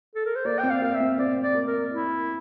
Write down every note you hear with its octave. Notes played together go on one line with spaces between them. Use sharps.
A4
A#4
C5
A#3 D5
C4 G5
F5
A#3 F5
E5
C4
C4 D5
D5
A#3
A#4
E4